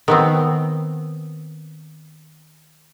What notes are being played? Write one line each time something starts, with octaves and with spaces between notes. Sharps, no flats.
D#3 B3 C4